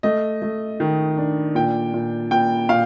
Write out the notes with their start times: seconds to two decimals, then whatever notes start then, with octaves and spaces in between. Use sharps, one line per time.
0.03 A3 D#5
0.42 A3
0.80 D#3
1.18 D4
1.55 A#2 G5
1.94 A#2
2.31 A#2 G5
2.69 A#2 F5